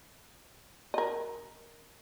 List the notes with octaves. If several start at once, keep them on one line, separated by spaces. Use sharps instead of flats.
A#4 D#5